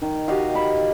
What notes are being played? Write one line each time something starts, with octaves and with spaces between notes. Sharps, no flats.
D#3
F#4 G4 D#5 F5
B5